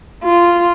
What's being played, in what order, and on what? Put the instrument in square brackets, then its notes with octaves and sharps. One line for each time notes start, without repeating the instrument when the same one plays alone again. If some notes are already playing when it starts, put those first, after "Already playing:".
[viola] F4